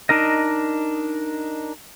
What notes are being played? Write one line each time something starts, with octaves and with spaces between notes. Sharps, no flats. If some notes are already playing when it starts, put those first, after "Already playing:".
D4 D#4 A#4 D#5